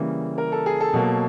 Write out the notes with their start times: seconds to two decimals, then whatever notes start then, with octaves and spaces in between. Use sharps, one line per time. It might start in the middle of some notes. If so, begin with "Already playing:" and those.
Already playing: C#3 E3 G3 A#3
0.38 A#4
0.52 A4
0.66 G#4
0.81 A4
0.93 B2 F#3 A#3